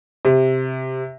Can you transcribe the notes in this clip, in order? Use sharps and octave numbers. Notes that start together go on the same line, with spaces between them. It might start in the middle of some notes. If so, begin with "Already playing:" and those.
C3